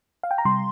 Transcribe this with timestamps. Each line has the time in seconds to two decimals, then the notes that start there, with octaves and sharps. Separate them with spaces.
0.23 F5
0.31 G5
0.38 A#5
0.45 C3 G3 C6